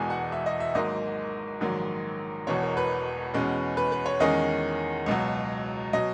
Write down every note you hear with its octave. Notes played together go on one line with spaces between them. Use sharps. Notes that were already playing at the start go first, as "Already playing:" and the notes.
Already playing: E1 E2 B2 G#3 G#5
F#5
E5
D#5
E5
G#1 G#2 F#3 A#3 D#4 D#5
A#1 G#2 D#3 F#3
E1 E2 B2 C#5
A#4
B4
E2 B2 G#3 C#4
B4
B4
C#5
E2 D#3 G#3 C#4 D#5
C#2 B2 F#3
B2 F#3 D#5